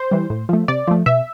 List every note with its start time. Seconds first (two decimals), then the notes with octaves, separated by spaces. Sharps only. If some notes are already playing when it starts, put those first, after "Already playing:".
Already playing: C5
0.11 E3 G3
0.30 A2
0.49 F3 A3
0.68 C3 D5
0.87 F3 A3
1.06 B2 E5